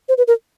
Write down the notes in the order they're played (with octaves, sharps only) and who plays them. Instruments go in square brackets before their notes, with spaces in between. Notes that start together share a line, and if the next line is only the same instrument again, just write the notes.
[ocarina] C5
B4
A#4